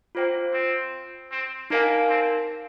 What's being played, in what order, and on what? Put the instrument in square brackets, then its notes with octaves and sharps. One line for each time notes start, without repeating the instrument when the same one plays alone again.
[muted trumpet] A#3 [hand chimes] F4 C5 G5
[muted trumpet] C4
C4
[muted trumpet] A#3 [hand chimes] D#4 A#4 F5 G#5
[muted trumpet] C4